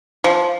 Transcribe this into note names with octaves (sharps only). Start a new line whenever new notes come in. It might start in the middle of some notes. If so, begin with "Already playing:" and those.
F3